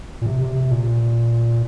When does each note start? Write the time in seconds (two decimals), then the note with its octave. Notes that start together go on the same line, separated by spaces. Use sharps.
0.22 A#2
0.26 C3
0.41 C3
0.56 C3
0.71 A#2